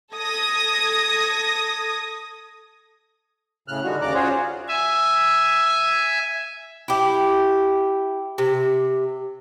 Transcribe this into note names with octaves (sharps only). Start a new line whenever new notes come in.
A4 D#6 G#6 A#6
A2 C#3 F6 F#6
D3 D#3 G3 F#4
D#2 C#3 D5 A#5 D6 F#6
C#4 F4 F#4 G#4 C5 C#5
E5 G#5
E4 G4
C3